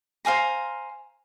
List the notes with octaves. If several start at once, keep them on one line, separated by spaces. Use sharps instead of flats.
C5 F5 G#5 A#5